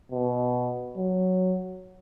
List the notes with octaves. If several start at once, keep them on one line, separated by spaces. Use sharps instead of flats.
B2
F#3